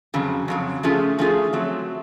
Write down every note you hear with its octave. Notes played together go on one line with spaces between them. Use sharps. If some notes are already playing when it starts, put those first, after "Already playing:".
F2 C#3 F#3
F2 C#3 F#3
F3 A3 C#4 F4 G#4
F3 A3 C#4 F4 G#4
F#3 A3 C4